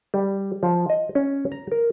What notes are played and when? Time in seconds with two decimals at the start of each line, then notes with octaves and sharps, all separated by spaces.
0.14 G3
0.63 F3
0.90 D#5
1.15 C#4
1.52 A#5
1.72 A#4